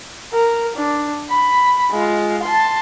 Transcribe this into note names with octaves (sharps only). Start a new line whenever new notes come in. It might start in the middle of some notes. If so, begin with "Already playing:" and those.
A#4
D4
B5
G#3 F4
A5 C6